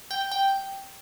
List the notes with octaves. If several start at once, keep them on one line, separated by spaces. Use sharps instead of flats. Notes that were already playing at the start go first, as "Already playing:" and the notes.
G5
G5